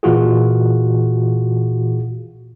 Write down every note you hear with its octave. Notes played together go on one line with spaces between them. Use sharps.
A#2 E3 F4 F#4 G#4